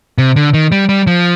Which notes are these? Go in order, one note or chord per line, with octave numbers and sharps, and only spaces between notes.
C3
D3
D#3
G3
G3
F3